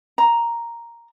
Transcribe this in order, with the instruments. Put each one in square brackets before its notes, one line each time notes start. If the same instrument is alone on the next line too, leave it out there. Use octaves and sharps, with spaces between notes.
[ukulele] A#5